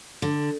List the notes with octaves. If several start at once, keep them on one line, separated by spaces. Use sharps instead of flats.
D3